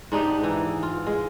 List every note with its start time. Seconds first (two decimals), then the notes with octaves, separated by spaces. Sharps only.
0.12 G#2 D4 D#4 G4
0.43 E3
0.83 F4
1.06 G#3